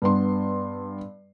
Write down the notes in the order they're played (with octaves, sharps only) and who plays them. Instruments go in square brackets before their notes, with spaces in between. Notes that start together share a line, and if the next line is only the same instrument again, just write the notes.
[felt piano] G2 B3 C6